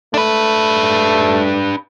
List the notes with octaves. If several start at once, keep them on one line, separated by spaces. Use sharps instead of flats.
A3 D4 B4